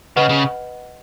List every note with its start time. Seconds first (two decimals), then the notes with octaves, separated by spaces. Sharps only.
0.16 C#3 B4 D#5 F#5 B5
0.29 C#3